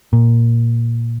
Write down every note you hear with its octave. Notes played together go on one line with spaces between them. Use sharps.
A#2